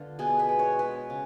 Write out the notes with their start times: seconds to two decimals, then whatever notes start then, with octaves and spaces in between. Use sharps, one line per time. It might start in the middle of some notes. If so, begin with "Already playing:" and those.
Already playing: D3 B3 D4 F4
0.19 B2 G#4
0.39 B4
0.49 G#3
0.59 C#5
0.79 G#3 B4
1.10 C#3